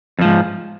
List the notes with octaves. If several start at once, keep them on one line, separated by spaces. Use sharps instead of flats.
F2 G#2 F3